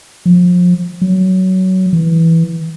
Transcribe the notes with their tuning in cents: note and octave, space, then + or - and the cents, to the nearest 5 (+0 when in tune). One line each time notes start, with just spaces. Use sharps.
F3 +30
F#3 +15
E3 -5